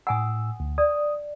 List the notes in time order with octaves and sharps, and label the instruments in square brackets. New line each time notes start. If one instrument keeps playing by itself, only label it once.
[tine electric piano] A2 E6 [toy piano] F#5 G#5 D#6
[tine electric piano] D2
[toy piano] D5 [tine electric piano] D#6